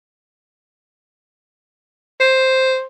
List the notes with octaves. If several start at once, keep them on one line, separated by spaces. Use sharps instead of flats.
C5